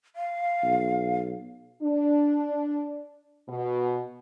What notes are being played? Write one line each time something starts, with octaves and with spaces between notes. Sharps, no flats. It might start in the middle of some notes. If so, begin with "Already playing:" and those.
F5
B1
D4
B2